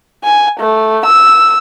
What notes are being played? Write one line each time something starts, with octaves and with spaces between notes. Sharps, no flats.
G#5
A3
E6